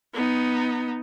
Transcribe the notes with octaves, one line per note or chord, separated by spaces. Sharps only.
B3 D#4